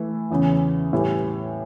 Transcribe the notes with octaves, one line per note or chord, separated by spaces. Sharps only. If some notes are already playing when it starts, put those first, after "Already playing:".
Already playing: E3 A3 E4
E2 C#3 E3
A2 E3 G3